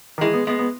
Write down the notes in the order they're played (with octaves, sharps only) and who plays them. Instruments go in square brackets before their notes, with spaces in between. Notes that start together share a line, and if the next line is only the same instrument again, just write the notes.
[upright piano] D#3
[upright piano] E3 [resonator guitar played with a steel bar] G#3
[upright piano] B3
[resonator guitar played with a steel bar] G#3 [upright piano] B3
[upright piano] B3